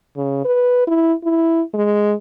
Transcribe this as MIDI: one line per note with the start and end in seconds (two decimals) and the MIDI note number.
0.17 0.41 49
0.45 0.82 71
0.87 1.13 64
1.24 1.62 64
1.74 2.13 56